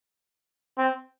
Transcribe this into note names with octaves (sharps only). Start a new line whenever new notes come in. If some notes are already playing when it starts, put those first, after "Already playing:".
C4